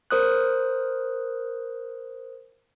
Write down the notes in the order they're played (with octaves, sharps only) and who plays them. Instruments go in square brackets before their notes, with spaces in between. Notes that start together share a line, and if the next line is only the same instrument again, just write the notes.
[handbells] A#4 C5 D#6 F#6